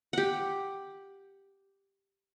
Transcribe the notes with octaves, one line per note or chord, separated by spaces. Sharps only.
G4 F#5